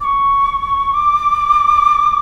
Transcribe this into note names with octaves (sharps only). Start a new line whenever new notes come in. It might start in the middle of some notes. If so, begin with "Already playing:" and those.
D6
C#6
D6